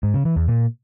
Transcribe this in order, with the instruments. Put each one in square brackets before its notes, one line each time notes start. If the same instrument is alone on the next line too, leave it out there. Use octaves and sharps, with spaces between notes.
[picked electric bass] G#2
C#3
E3
E2
A#2